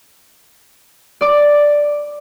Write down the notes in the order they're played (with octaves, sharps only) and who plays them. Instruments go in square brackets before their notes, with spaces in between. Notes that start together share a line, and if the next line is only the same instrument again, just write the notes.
[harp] D5 D6